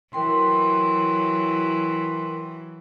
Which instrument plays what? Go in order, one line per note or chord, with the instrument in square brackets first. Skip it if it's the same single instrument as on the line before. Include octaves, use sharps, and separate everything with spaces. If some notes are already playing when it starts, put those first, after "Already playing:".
[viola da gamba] E3 F#3 [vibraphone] A#4 G5 C6